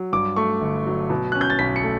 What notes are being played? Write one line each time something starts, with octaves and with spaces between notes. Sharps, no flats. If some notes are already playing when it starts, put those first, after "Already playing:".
Already playing: F#3
G2 D6
A3 C#6
G1
F#3
B2
C#4 F#6
G6
A6
B1 B6
C#7
A3